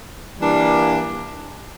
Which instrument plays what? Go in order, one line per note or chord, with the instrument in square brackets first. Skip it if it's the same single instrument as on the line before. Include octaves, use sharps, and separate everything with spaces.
[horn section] E3 G3 A#3 D4